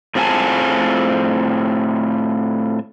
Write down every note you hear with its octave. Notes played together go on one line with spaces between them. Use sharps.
A2 C4 F4 G#4 G#5 A5